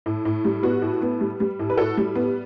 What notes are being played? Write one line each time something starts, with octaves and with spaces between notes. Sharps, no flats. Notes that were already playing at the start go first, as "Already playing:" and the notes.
A2
A2
G3
B3 F#4
A2
B3
G3
G3
A2
B4
A2 F#4 A4
G3
B3